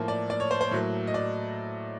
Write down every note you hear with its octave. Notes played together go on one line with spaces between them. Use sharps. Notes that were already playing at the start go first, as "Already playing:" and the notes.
Already playing: A2 F3 A#3
D5
D5
C#5
C5
C5
A2 F#3 A#3
D#5
D5